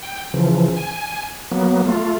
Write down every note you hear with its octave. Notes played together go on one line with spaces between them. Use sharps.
G5
C#3 E3 F3
G#5
F#3 A#3 B3
A3 F4